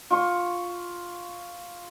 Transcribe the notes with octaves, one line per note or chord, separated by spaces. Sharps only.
F4 C#6